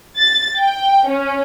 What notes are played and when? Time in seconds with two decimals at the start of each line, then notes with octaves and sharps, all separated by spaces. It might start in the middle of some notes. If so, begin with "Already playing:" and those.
0.18 A6
0.58 G5
1.08 C#4